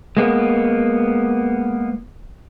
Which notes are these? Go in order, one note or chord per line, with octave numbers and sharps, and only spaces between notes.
G#3 A#3 B3